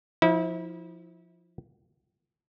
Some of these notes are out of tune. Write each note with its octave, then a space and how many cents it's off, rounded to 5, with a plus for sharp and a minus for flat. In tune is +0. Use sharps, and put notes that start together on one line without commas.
F3 +5 E4 -35